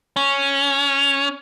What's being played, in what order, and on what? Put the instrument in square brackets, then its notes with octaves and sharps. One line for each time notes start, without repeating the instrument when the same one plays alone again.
[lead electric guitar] C#4